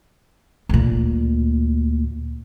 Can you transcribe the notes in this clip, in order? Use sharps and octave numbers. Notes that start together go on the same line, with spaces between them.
D2 A#2